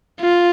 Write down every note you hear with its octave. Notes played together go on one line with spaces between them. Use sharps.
F4